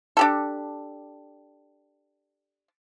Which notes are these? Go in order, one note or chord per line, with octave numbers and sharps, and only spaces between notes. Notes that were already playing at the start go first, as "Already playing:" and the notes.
D4 G4 A4